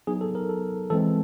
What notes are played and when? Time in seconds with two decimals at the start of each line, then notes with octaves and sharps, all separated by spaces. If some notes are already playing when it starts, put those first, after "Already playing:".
0.07 F#3 B3 D#4 G#4
0.21 A4
0.35 A#4
0.49 A4
0.90 E3 G#3 C4 A4